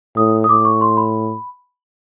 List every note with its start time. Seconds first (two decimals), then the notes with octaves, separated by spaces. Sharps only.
0.17 A2 D#6
0.44 D#6
0.49 A2 D6
0.65 C#6
0.81 C6
0.97 B5